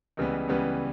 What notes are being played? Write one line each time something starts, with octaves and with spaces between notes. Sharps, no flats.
C#2 C#3 E3 G3 B3
C#2 C#3 E3 G3 B3